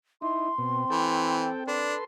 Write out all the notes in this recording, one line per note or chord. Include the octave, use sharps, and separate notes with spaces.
D#4 E4 C6
B2 C4
E3 A4 G5
D4 A4 B4 C6